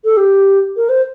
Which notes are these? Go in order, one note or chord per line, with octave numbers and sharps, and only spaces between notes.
A4
G4
A#4
C5